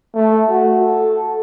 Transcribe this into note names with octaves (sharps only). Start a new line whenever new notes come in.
A3
F#4
A4